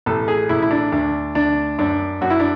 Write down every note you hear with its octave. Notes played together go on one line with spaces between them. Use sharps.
A1 A4
G#4
A1 E4
E4
D4
D2 D4
D2 D4
F#2 D4
F#2 F#4
E4
D4